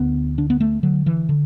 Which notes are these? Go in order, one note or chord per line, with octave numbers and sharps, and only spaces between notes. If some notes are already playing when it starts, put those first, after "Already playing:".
Already playing: D2 B3
D3 D4
B3
A3
D3 F#3
E3
D3